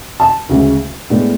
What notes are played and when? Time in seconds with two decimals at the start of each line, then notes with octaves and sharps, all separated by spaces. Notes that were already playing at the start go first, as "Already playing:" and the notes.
0.20 A5
0.49 D2 C#3 G#3 C#4
1.10 A2 G#3 B3 D4